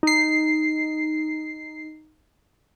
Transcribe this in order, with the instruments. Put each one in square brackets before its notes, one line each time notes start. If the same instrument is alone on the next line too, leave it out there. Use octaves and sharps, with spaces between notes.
[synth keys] D#4 C7